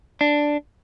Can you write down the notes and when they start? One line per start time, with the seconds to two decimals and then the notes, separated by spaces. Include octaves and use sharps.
0.21 D4